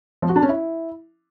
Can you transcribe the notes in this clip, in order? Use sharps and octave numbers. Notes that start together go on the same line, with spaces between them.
F3
F#4
D4
C#4
E4